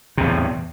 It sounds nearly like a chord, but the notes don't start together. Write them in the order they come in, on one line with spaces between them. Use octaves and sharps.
C3 E2 A2